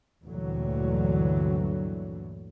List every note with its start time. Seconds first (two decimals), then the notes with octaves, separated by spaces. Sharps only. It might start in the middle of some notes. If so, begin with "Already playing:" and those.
0.24 D2 G2 A#2 D3 E3 F#3